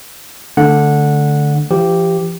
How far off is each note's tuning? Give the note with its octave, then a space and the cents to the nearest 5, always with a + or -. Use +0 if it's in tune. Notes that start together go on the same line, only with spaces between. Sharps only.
D3 +0 A3 +0 F#5 -15
F3 -45 G4 +0